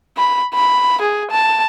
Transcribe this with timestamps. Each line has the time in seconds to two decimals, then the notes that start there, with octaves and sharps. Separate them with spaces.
0.17 B5
0.54 B5
1.01 G#4
1.31 A5